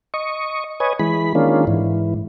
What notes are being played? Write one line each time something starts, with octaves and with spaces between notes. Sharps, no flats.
D#5 C#6
B4 C#5 D#5 G#5
E3 G#3 B5
D#3 G#3 A#3 C#4 D4 F4
G#2 E3